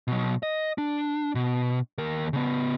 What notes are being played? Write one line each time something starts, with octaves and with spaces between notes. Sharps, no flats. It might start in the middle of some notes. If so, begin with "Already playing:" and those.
B2 F#3
D#5
D4
B2
D#2 A#4
C#3 B3